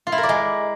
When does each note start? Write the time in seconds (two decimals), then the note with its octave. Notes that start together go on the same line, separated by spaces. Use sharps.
0.07 F4
0.12 E4
0.18 A#4
0.23 D5
0.29 G#3